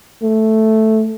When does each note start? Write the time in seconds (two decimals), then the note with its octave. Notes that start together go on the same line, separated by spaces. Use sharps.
0.23 A3